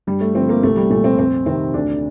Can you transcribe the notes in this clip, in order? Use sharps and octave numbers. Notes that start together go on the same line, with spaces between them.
G2 G3
A3
D3 F3 C4
A#3
C2 A3
G3
A#2 F3 A3
C4
F2 C4
C3 D#3 C4
D2 D4